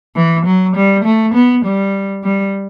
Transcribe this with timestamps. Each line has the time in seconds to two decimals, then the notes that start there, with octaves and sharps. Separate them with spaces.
0.15 E3
0.45 F#3
0.75 G3
1.04 A3
1.33 B3
1.63 G3
2.23 G3